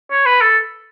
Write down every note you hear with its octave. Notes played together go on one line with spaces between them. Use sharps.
C#5
B4
A4